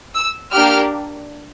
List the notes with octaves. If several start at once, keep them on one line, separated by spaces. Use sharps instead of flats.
E6
A#3 D4 G4 F6